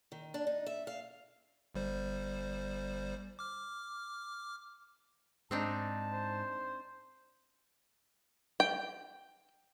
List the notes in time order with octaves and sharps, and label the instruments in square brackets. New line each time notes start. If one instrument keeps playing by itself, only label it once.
[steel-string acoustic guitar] D#3
D4
D#4
E5
F5
[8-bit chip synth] G1 G3 C5
D6 F6
[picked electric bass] G#2 [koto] C4 D4 D#4 [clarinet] A5
[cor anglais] C5
[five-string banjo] G5